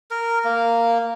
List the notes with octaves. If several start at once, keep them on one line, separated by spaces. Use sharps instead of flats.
A#4
A#3